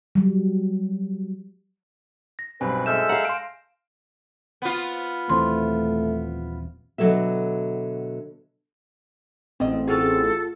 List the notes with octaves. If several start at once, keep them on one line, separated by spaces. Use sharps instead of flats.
F#3 G3
A#6
B1 G2 C4 B4 G#5
G#3 A4 E5 F6 G6 E7
F5 F#5 A#5
C6 D7
B3 F4
D#1 E3 A3 C4 C6
B2 D3 E3 F#3 A4 E5
A1 G#2 D3 C4 D#5
F4 F#4 G#4 A4